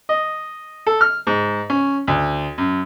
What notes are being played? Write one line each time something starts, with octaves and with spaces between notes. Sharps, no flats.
D#5
A4
F6
G#2
C#4
D2
F#2